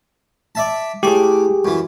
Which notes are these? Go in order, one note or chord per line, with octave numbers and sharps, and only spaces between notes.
D5 E5 A5
A2 G4 G#4 D6
F#2 E3